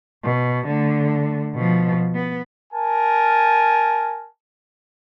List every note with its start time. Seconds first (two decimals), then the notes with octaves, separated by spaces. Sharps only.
0.24 B2
0.68 D3 A3
1.55 B2 F3
2.15 B3
2.74 A#4 G#5 A5